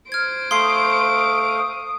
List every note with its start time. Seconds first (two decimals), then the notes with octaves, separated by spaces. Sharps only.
0.12 C5 F6 G#6 D7
0.51 A3 F5 C6 D#6 C7